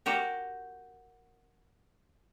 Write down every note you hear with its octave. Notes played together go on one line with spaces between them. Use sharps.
F#4 G4 A#4